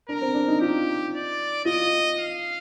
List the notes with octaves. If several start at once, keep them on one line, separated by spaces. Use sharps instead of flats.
D4 A#4
C4
D4
D#4
F4 G4
D5
F4 D#5
F5